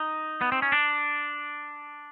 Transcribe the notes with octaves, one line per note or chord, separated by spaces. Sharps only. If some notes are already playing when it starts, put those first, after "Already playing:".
Already playing: D#4
B3
C4
C#4
D4